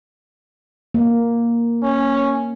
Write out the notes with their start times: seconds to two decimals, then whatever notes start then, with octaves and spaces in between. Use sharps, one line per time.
0.94 A#3
1.83 C#4